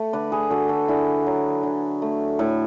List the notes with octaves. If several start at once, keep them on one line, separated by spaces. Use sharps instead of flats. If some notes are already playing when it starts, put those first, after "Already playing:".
Already playing: A3
D3 B4 D5
G#4 B4
D3 F#4 A4
F#4 A4
D3 E4 G#4
F#3
D3
A3
A2